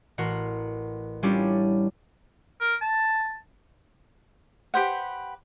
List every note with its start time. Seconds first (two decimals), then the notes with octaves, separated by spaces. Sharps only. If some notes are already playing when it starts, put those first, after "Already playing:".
0.18 A1 F#4 A#4 F#5 C6
1.23 G3 C#4 D4 E4 F4 G4
2.61 A#4
2.82 A5
4.74 G4 B4 C5 F#5